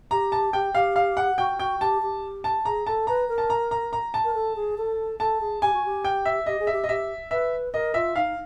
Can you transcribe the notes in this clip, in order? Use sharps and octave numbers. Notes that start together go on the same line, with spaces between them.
G4 A#5
A5
G4 G5
G4 F5
F5
F#5
F#4 G5
F#4 G5
G4 A5
G4
A5
G#4 A#5
A4 A5
B4 A#5
A#4
A5
A#5
A#5
A#5
A5
A#4
A4
G#4
A4
A4 A5
G#4
G4 G#5
F#4
G4
G5
E5
G4 D#5
G#4
G4 E5
D#5
G4 E5
B4 E5
A#4 D#5
F4 E5
D#4 F5